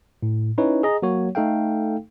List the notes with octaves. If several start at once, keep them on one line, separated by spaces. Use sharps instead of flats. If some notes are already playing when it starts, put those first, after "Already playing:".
A2
C#4 D#4 E4 B4 C#5
G#4 D#5 A#5
F#3 A#3 F#4 C#5
A3 D#4 A4 F5 G5